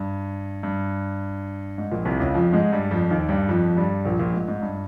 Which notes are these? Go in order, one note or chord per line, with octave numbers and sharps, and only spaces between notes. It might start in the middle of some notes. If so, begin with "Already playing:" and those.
Already playing: G2
G2
G#2
A#1 A#2
C2 C3
C#2 C#3
F2 F3
G#2 G#3
G2 G3
F2 F3
D#2 D#3
G2 G3
F2 F3
F3
G2 G3
A#1 A#2
A#1 A#2
G#2
G#2
G2